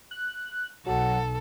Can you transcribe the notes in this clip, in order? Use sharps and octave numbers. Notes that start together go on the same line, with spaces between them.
F#6
B1 F#3 A4 F#5